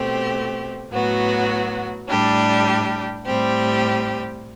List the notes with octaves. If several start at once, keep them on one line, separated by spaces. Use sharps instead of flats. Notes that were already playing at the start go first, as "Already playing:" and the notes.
Already playing: B2 A3 C4 G4
A2 F#3 B3 F#4
A2 G3 D4 G4
A2 G3 C4 G4